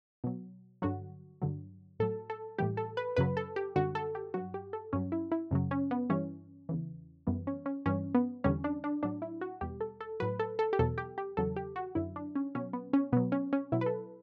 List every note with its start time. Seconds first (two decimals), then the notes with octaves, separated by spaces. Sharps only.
0.24 B2 F#3
0.82 G2 D3 F#3 F#4
1.42 G2 D3 F#3
1.99 A2 F#3 A4
2.30 A4
2.58 A2 E3 G3 G4
2.77 A4
2.97 B4
3.16 F#2 C#3 F#3 B4
3.37 A4
3.56 G4
3.76 F#2 D3 G3 F#4
3.95 A4
4.15 G4
4.34 G2 F#3 F#4
4.54 G4
4.73 A4
4.93 G2 F#3 C#4
5.12 E4
5.32 E4
5.51 F#2 C#3 F#3
5.71 C#4
5.91 B3
6.10 G2 E3 G3 C#4
6.69 E2 C#3 E3
7.27 F#2 E3 G3 B3
7.47 C#4
7.66 C#4
7.86 G2 E3 G3 C#4
8.15 B3
8.44 E2 D3 G3 C#4
8.64 D4
8.84 D4
9.03 A2 F#3 D4
9.22 E4
9.41 F#4
9.61 E2 B2 G3 G4
9.81 A4
10.00 A4
10.20 A2 F#3 B4
10.39 A4
10.59 A4
10.73 G4
10.79 E2 B2 F#3 A4
10.98 G4
11.18 G4
11.37 E2 C#3 F#3 A4
11.56 G4
11.76 F#4
11.95 F#2 D3 F#3 E4
12.16 D4
12.35 C#4
12.55 B2 F#3 C#4
12.73 B3
12.93 C#4
13.12 B2 F#3 B3
13.32 C#4
13.53 C#4
13.72 B2 F#3 E4
13.81 B4
13.86 A4